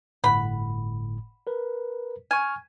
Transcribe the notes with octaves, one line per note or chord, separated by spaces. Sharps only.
G1 A2 F#5 B5
A#4 B4
G#5 C#6 F6